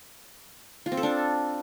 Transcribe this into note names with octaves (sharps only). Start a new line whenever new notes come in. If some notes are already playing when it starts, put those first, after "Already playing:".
F4
C4
A4
D4